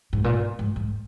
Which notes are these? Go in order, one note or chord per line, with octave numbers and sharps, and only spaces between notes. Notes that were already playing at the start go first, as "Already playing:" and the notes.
G#2
A#2
G#2
G#2